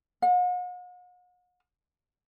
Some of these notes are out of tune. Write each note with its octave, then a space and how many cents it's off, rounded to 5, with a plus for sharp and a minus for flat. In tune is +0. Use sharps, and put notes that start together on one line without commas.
F#5 -45